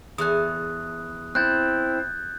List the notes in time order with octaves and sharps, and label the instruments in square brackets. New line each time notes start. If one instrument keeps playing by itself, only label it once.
[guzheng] E2 A4 G#5 [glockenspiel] D#6 F#6
[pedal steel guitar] C4 E4 [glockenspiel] F#6 G6 A6